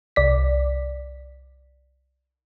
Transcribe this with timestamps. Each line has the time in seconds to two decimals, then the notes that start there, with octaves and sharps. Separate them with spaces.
0.16 C2 D5 B6